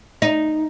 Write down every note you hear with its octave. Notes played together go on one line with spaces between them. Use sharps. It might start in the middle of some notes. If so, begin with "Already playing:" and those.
D#4